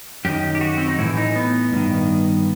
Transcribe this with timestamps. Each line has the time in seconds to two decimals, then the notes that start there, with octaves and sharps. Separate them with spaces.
0.25 F#2 D#3 G4
0.55 G4
0.61 F#4
0.78 C4
0.88 D#4
0.98 A2 E3 E4
1.17 D#4
1.36 B3
1.73 G2 D#3